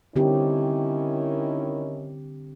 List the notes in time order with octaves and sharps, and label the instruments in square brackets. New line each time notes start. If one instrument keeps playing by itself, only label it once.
[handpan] D3 C4 G4 [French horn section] D#3 C#4 E4